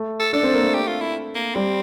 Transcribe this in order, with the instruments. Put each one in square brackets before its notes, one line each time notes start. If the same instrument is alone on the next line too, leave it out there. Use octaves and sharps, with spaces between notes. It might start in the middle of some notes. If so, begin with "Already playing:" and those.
Already playing: [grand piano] A3
[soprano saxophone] A4
[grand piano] D4 [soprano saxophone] A4
[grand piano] C4
A#3
A3
[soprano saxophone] G4
F4
E4
A#3
[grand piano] G3 [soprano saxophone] C4